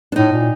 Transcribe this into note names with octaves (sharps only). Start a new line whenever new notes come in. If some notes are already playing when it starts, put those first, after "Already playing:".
D4
A2 D#4
A#2